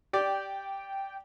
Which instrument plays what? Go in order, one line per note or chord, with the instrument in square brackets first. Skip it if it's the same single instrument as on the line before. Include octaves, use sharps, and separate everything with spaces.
[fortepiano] G4 D5 [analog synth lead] G5